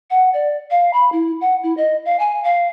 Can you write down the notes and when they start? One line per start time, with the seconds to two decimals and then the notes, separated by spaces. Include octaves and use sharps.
0.10 F#5
0.34 D5
0.71 F5
0.93 B5
1.12 E4
1.41 F#5
1.63 E4
1.77 D#5
2.05 F5
2.19 G#5
2.44 F5